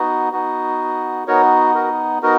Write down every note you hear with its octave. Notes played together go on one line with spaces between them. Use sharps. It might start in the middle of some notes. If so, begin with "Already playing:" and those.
Already playing: B3 D#4 F#4
B3 D#4 F#4
B3 D#4 F#4 A#4 C#5
F#4 A#4
B3 D#4 F#4 A#4